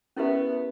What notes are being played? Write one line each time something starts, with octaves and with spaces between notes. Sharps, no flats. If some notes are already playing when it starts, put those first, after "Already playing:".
B3 C#4 E4 G4 A#4 E5